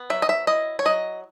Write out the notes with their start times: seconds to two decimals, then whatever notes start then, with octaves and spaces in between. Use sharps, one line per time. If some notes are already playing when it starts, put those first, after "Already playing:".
Already playing: B3
0.10 F#3 E5
0.22 D#5
0.29 E5
0.47 E4 D#5
0.79 C#5
0.85 F#3 D#5